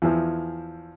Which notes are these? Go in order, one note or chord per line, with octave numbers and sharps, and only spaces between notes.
E2 E3 F3